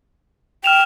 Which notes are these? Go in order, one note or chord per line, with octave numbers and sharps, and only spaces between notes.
G5 F6 E7 F7